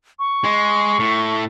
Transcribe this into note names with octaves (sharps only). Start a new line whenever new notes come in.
C#6
G#3
A2